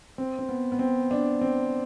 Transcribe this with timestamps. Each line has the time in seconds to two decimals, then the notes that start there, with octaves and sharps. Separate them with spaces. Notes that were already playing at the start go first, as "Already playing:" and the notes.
0.18 C4
0.39 C4
0.49 B3
0.72 B3
0.79 C4
1.11 D4
1.41 C4